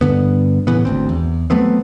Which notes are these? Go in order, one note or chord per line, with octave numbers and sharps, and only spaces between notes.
G2 D3 B3
A2 C#3 E3 B3
G#1 D2 C4
E2
F#3 A3 B3 C4